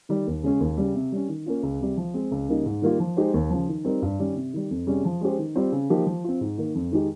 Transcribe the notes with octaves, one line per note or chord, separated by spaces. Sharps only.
D#3 G3
D#2
C#3 G#3 C#4 G#4
D#2
C#3 G3
C3
G3 C#4
D#3
A#3 C#4 F4
C#2
C3 G3
F3
G#3 C4
C#2
C#3 G3 A#3 D#4
G#2
D#3 G3 A#3 F4
F3
G#3 D#4 G4 C5
D#2
C#3 F3
D#3
G3 C4 D#4 A#4
G2
D#3 G3 C#4
C3
D#3 G3
F2
C3 G3 C#4 G#4
F3
G#3 C#4 G4 C5
D#3
G3 C4 F4 C5
C#3
F3 A#3 D#4 G4
F3
C4 F4
G#2
D#3 A#3
F2
D#3 G#3 D#4 G4